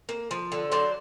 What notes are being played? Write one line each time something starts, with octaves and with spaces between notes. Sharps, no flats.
A#3
F3
D3
F#3 C5 D5